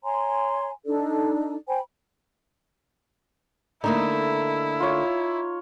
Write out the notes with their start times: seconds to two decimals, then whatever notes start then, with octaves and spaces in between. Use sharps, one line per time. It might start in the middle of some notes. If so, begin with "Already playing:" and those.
0.03 C#5 G#5 A#5 C6
0.85 D4 D#4 A4 D5
1.68 C5 G5 G#5 B5
3.84 D3 A3 A#3 D#4 E4
4.80 F4 C#5